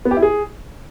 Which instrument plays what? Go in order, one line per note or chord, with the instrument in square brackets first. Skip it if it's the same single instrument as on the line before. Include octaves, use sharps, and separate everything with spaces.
[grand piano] B3
G4
E4
G#4